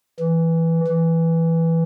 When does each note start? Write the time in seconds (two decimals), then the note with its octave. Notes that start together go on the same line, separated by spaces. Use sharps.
0.20 E3
0.88 E3